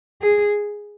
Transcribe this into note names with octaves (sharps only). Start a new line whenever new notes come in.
G#4